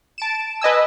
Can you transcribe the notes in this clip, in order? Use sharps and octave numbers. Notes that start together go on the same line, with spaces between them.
A5 D7 E7
B4 D#5 G#5 E6